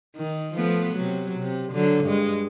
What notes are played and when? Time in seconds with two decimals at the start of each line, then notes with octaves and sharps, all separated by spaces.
0.16 D#3
0.54 F3 A3 B3
0.93 C3 F#3
1.40 C3
1.73 D3 F#3
2.04 G2 G#3